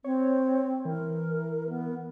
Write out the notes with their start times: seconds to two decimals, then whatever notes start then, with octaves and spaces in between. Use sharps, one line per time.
0.04 C4 C#5
0.85 E3 A#4
1.69 B3